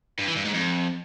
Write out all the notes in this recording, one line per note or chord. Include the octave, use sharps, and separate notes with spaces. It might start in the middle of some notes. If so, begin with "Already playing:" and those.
G2
E3
G2
G#2
F2